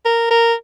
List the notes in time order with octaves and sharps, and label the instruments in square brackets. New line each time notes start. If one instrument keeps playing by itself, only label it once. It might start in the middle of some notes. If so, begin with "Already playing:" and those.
[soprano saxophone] A#4
A#4